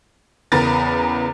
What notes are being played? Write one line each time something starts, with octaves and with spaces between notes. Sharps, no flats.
E2 C#3 A#4 B4 A#5 A6